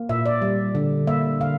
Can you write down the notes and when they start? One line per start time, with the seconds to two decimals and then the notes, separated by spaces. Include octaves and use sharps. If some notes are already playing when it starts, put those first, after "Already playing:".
Already playing: A#3
0.09 A#2 E5
0.26 D5
0.42 G3
0.75 D3
1.07 A#3 E5
1.41 D3 F5